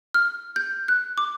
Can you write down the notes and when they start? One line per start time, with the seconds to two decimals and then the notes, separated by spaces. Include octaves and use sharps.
0.14 F6
0.56 G6
0.88 F#6
1.18 D6